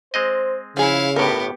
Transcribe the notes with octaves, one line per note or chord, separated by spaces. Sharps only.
G#3 C4 C5 D#5
C#3 F3 E4 G#4 F5
G1 A2 B3 G4 A#4